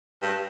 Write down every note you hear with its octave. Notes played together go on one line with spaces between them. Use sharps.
G2